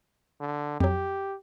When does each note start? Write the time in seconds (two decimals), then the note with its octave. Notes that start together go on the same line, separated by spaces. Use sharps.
0.40 D3
0.80 F2 F#3 G4